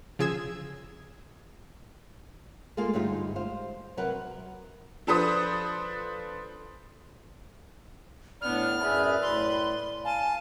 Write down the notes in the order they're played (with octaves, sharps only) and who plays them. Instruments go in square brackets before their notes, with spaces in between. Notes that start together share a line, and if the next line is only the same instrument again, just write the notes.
[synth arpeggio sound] C#3 F3 G#4 E6 G#6 E7
[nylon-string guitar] G#3 A#3 F4 A4 F5
D2 G2 G#3 D#4 F4 G4
C5 F5
C3 F#3 A#4 B4 F#5
[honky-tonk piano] F3 D4 A4 B4 C5 D#6
[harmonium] A2 [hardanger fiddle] B3 D4 [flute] D5 [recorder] F6
[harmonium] F#2 G#4 E5 [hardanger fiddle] B4 B5
[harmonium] A2 [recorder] C6
[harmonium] F5 [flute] G#5 [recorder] A5